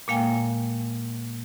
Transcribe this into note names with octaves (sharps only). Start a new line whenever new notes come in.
A#2 G#3 A#3 F5 G5 G#5